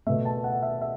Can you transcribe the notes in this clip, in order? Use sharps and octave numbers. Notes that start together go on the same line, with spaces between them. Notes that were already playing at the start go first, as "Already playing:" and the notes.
B2 A3 E5
A5
F#5
E5
E5